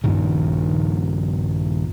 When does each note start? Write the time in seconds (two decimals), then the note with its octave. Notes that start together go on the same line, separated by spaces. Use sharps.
0.04 A#1 G2 A#2 D#3